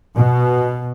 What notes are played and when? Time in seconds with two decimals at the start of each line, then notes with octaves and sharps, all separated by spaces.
0.15 B2